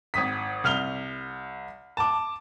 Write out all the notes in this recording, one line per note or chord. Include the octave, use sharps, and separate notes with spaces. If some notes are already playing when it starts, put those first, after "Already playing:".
G#1 D#6 B6
C2 F6 F7 G7
A5 D6